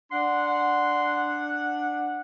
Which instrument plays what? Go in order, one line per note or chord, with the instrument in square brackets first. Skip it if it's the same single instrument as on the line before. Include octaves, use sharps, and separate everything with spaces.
[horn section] D4 F#5 [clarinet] C6